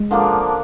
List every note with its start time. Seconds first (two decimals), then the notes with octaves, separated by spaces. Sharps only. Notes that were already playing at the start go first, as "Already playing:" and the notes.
Already playing: G#3
0.11 D3 F3 A#3 D4